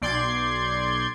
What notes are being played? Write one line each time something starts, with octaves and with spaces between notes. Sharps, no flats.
B1 D5 C6 G6 G#6